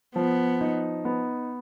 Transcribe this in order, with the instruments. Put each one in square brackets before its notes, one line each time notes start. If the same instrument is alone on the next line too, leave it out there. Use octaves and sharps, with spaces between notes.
[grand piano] F3 [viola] B3
[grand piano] D#4
B3